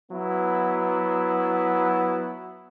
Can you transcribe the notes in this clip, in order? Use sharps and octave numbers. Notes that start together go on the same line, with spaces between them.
F#3 B3 E4